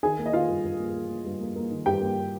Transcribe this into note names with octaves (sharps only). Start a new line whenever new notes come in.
D#3 G#4 G#5
A#3
D#5
D#3 F4 F5
G2
G2
A#3
A#3
A#3
G2
A#3
A#3
D#3
G2 G4 G5
A#3